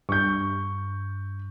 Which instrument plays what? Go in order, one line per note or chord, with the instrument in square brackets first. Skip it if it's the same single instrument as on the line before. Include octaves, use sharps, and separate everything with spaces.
[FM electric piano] G2 [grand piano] C#6 G6